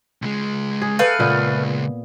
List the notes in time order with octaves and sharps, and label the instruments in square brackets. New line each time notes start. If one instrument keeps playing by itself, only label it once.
[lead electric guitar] C#2 G#3
[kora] G#4
[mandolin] A3 B4 F5
[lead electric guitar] C#2 [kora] A#2 B3